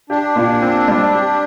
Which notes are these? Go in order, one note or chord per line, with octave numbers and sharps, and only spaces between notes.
D4 G4
A#2
C4
G3
G4